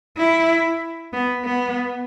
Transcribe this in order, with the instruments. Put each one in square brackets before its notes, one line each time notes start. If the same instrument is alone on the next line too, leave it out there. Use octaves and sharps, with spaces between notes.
[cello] E4
B3
B3